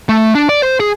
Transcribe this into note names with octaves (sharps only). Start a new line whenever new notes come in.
A3
D4
D5
C5
G#4